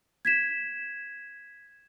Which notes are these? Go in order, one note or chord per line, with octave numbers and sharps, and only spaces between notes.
G#6 B6 E7